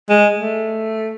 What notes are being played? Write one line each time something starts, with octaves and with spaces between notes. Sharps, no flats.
G#3
A3